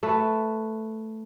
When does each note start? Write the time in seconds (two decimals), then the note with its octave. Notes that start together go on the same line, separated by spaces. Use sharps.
0.03 A3 A4 B4